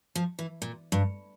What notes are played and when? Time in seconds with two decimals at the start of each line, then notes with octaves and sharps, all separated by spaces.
0.15 F3
0.39 E3
0.62 A#2
0.92 G2